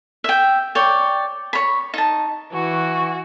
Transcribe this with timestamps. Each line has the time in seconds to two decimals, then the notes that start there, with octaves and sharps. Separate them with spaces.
0.24 E5 G5
0.75 C#5 D5 G5
1.53 C#5 B5
1.94 D#4 A5
2.54 E3 F#4 C#6